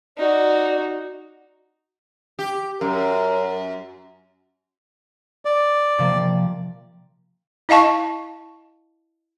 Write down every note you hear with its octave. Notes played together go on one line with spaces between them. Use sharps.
D#4 F#4 D5
G4
F#2 A#4
D5
C3 F3 A#3
E4 D#5 F5 A5 C#6